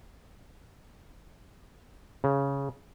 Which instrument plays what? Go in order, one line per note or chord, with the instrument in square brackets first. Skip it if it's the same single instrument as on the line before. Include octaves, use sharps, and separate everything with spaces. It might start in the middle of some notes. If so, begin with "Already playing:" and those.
[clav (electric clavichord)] C#3